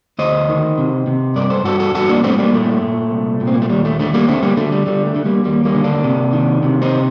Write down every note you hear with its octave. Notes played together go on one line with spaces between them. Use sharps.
D2 C5 D#5
D#3
C3
C3
G2 A#4 D5
A4 C5
G2 F#4 A4
F#4 A4
G2 F#4 A4
A#3 D4
G2 A3 C4
G3 A#3
A#2 A3
A#2
C2
A#2
C4
A#3
A3
D#2 G3
A3
D3 A3
G3 A#3
D3 A3 C4
G3 A#3
D3 A3
G3
D3 G3
A3
D3
G3 A#3
D#2 G3 A#3
G3 A#3
D3
A#3 D4
C3
D#3
C3
C4 D#4